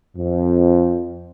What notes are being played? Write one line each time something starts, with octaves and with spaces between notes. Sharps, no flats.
F2